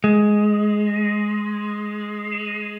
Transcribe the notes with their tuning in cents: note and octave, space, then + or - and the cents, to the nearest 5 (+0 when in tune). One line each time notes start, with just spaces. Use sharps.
G#3 +10